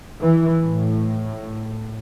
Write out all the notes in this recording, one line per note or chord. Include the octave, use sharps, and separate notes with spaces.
E3
A2